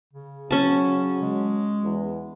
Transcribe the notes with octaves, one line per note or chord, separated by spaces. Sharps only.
C#3
F#3 C#4 A5
G#3
E2